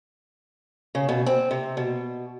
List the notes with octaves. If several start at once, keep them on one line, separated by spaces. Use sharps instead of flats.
C#3
B2
C4
C3
B2